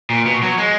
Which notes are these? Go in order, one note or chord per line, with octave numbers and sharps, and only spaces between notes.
A#2
B2
F#3
G#3